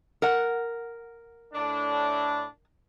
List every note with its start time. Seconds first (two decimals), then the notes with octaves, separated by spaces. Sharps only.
0.22 A#4 F#5
1.53 A2 D4